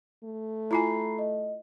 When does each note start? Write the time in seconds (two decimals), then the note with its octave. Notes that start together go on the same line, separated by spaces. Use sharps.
0.24 A3
0.71 E4 F4 G#5 A#5 B5 C7
1.19 D#5